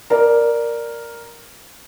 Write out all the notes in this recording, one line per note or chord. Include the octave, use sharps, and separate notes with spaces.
A#4 D5